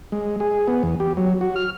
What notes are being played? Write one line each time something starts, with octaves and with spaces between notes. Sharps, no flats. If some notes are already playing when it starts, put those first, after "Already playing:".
G#3
G#4
B3
E2
G4
F#3
F#4
F6